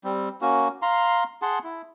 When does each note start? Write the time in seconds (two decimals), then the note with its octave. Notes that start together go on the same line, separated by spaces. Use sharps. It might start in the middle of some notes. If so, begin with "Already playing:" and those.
0.04 G3 C4
0.42 A#3 C#4 F#4
0.82 F5 A#5 C6
1.42 G#4 F#5 A5 C6
1.64 E4